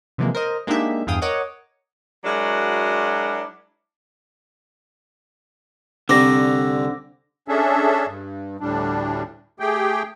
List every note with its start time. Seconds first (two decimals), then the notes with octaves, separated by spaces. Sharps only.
0.18 C3 E3 F3 G#3 A#3
0.35 A#4 C5 D#5
0.67 G#3 A#3 D4 D#4 G4 E5
1.07 E2 G2 G#4 F5 G5 D#6
1.22 A#4 C#5 D#5 F#5 D6
2.24 F#3 G#3 D4 E4 F#4 A#4
6.09 C2 D3 C4 D#4 D6 A#6
7.48 C#4 D4 G#4 A4 E5
8.07 G2
8.60 D2 A2 G3 D4
9.60 A3 G4 G#4 G5